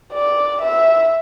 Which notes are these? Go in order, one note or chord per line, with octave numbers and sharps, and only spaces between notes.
D5
E5